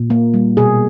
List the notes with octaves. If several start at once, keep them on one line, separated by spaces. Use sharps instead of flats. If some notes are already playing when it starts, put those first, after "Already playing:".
Already playing: A#2
A#3
G3
B2 G#4